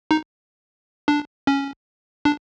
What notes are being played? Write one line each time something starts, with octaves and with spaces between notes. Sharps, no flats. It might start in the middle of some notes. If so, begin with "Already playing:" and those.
D#4
D4
C#4
D4